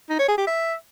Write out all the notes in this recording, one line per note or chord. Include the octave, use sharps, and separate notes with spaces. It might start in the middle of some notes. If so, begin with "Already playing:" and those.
D#4
C#5
G#4
G4
E5